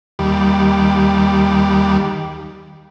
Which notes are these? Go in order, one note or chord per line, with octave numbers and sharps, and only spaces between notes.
D#2 G3